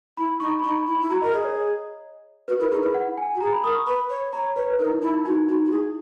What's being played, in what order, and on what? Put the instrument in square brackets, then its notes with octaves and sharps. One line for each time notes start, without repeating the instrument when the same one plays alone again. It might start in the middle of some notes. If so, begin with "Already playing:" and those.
[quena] E4 [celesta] B5
[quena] D#4 [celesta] C#6
[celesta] B5
[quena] D#4 [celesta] C#6
[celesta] B5
[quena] E4
[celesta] B5
[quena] E4
[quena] F#4 [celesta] A#5
[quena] A#4 [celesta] D#5
[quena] G#4 [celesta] D#5
[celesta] C#5
[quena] F#4 [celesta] B4
[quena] E4 [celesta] A#4
[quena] D#4 [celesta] G#4
[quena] E4 [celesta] B4
[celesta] F#5
G#5
[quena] F#4
[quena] G#4 [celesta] A#5
[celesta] B5
[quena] A#4 [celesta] D#6
[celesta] C#6
[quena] B4 [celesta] B5
[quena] C#5
[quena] C#5 [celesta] A#5
[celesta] B4 [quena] C#5
[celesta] B4
[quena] D#4 [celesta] A#4
[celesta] E4
[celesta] D#4 [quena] E4
[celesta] E4
[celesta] D#4 [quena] F#4
[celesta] D#4 [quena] F#4
[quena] F#4
[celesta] E4 [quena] G#4